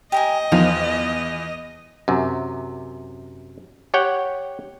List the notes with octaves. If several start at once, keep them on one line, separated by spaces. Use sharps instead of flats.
G4 A#4 D#5 G#5
E2 D#3 F3 F4
F#2 C3
G4 C#5 F#5 G5